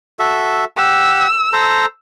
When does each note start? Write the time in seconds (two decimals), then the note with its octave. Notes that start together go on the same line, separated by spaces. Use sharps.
0.19 F#4 A4 E5
0.77 G4 F#5 E6
1.53 A4 C5 A#5